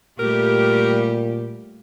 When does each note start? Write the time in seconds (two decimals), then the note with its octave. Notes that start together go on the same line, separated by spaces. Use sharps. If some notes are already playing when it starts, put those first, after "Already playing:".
0.19 A#2 G3 A3 G4 A#4